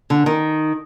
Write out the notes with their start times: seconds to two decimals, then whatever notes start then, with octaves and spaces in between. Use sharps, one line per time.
0.10 D3
0.26 D#3